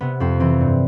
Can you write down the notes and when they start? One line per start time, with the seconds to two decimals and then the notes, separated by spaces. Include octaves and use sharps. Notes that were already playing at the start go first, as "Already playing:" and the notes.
0.01 C3 B3
0.20 F2 C4
0.40 E3 C4
0.61 G2